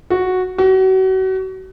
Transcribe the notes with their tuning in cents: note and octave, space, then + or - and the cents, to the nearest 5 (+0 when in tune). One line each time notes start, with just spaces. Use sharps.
F#4 -5
F#4 +35